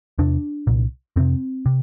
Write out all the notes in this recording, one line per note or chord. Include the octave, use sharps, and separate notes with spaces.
E2 C3 D4
C2 A#2
F2 C3 C4
C3